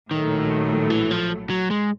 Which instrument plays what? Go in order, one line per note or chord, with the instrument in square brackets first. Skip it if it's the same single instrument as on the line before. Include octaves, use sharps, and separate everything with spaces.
[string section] A#1 A2 F#3 A3 [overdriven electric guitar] D#3
[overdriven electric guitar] E3
F3
F#3
G#3